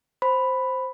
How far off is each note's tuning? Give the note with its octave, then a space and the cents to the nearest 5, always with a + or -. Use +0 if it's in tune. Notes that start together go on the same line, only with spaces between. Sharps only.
C5 +0 B5 +5